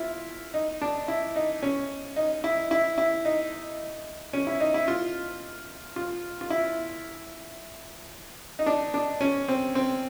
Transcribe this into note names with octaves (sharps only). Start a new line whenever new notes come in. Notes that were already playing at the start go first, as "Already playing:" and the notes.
Already playing: E4 F4
D#4
D4
E4
D#4
C#4
D#4
E4
E4
E4
D#4
C#4
E4
D#4
E4
F4
F4
F4
E4
D#4
D4
D4
C#4
C4
C4